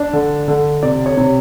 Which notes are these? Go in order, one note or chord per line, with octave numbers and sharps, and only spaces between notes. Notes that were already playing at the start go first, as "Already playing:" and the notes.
Already playing: D4
D3
D3
C3 D5
C#5
C3